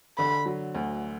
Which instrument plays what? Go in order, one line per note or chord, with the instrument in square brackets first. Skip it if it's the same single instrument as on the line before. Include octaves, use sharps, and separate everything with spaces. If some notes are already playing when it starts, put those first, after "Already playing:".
[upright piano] D3 [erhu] B5
[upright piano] F#3
D2